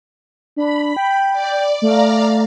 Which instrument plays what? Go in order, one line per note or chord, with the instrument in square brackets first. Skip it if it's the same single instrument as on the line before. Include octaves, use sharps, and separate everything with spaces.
[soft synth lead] D4 [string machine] B5
[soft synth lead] G5
[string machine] D5
[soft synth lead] A3 [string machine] D5 F5 A#5